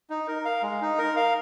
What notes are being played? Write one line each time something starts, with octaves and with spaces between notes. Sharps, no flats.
D#4
A#4
F5
G#3
D#4
A#4
F5